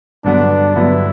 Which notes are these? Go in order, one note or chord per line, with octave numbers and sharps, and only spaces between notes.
G2 D3 F#3 B3 D4
G2 D3 F#3 B3 E4